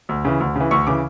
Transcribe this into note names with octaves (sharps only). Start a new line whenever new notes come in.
D2
C#3 E3
D2
C#3 E3
D2 C#6
C#3 E3 D6